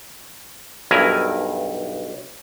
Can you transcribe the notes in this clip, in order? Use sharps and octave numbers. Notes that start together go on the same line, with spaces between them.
B1 G2 E4 A#4 G#5